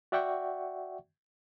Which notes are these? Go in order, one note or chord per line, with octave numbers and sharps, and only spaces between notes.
F#4 D5 E5 F#5 G5 C#6